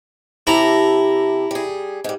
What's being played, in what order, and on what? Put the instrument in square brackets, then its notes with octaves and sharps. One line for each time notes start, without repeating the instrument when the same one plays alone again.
[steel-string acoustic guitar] C3 G4 A4 [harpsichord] E4 A#5
[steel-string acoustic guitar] G3 G#4
G#2 G3